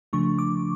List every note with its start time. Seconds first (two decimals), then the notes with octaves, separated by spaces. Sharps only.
0.13 C#3 F3 A3 D4 C#6
0.38 D6